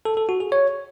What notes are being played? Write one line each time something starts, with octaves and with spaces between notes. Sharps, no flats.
A4
A4
F#4
G#4
C#5